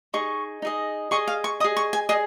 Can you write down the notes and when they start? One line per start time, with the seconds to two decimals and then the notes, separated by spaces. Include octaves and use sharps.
0.14 D#4 G#4 D#5 C#6
0.62 D#4 G#4 D#5
1.11 G#4 D#5 C#6
1.28 F5
1.44 C#6
1.60 D#5 D#6
1.64 G#4
1.77 C#6
1.93 G#5
2.09 G#4 D#5